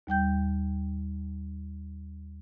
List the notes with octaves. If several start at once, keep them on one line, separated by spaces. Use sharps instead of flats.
D#2 G3 G5 G6